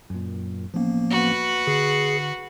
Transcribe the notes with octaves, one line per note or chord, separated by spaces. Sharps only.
F#2 A#2
A1 F3 A#3 B3 C#4
F#4 B4
D3 G#4 C7 C#7